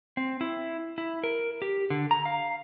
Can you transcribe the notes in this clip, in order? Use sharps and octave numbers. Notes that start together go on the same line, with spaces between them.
C4
E4
E4
A#4
G4
D3
A#5
F5